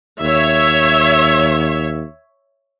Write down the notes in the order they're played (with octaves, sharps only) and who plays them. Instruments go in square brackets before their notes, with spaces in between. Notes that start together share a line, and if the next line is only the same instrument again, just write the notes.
[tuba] D#2 [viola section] C#5 E5